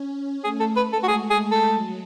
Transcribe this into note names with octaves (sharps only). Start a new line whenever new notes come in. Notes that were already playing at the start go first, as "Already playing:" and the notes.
Already playing: C#4
A3 G#4
A4
B4
A4
F#4
G#3 G#4
G#4
A4
F#3